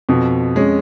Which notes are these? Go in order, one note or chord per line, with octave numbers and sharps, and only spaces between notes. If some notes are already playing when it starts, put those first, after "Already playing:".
F2 B2
G#3 C#4